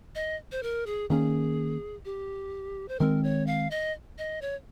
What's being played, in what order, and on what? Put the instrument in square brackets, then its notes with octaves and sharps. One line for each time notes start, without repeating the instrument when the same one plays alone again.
[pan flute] D#5
C5
A#4
G#4
[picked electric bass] D#3 A#3 C#4 [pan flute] G#4
[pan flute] G4
C5
[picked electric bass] D#3 G#3 C4 [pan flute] A#4
[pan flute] C#5
F5
D#5
D#5
C#5